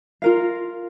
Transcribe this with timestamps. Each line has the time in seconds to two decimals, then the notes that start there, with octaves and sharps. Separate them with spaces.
0.22 F4 A#4 F5